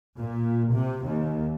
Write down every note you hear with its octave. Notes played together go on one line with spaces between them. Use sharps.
A#2
C3
D#2